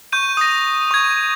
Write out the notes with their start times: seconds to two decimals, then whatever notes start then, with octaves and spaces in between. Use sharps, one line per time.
0.12 C#6 G6 D#7
0.37 D#6 A#6
0.91 C#6 G#6